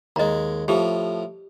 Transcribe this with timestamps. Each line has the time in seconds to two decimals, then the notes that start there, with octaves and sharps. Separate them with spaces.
0.16 D#2 G#3 D#5 A#5
0.68 A2 F3 G4